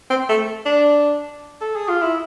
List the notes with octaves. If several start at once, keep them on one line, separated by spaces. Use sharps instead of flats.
C4
A3
D4
A4
G#4
F4
E4